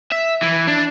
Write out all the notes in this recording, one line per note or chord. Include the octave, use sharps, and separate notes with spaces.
E5
E3
D4